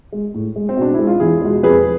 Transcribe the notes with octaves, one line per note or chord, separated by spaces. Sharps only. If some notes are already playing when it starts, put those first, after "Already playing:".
G#3
A2
G#3
C4
B2 D4
G#3 E4
F4
E2 E4 G#4
B2 G#3
F2 G#4 B4